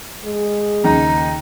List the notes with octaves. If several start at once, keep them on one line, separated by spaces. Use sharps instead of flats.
G#3
D#2 C#3 D#4 A#5